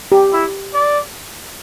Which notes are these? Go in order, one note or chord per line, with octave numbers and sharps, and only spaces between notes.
G4
E4
D5